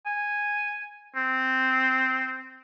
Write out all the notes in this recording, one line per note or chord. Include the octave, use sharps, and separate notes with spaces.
G#5
C4